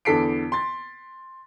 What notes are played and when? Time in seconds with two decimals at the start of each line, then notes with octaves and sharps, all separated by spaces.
0.05 E2 D3 A4 B6 C7 D7
0.52 C6 A6